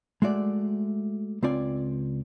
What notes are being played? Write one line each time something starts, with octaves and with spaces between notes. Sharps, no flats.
G#3 A3 F#4 D5
C#2 C4 F4 D5 G#5